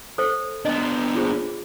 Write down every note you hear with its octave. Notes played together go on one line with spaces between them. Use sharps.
A4 C5 E5
B3 D4 D#5
F4 G#4 C5